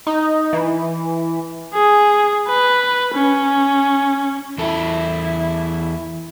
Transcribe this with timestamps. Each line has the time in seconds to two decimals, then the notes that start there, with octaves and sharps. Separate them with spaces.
0.07 D#4
0.53 E3
1.74 G#4
2.48 B4
3.15 C#4
4.58 E2 E4 A4